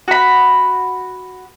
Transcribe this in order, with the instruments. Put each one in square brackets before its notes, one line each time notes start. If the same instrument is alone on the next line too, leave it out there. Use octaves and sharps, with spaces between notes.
[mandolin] F#4 B5